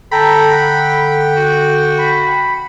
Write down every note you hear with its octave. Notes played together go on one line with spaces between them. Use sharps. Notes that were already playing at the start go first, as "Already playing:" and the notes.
D3 A4 G5 A#5 B5
F#5
F#4
B5